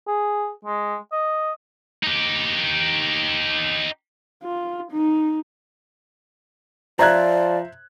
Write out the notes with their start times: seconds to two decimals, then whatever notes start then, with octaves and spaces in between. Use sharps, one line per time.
0.08 G#4
0.65 G#3
1.12 D#5
2.04 D#4 G4
4.43 F4
4.91 D#4
6.99 F3 C5 D5 E5 A#5 F#6 G#6